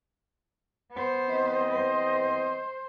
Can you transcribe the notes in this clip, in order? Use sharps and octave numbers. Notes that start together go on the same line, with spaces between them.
B3 C5
E2 C4 D#5
C5